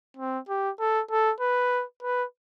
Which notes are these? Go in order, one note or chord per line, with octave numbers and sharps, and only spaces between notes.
C4
G4
A4
A4
B4
B4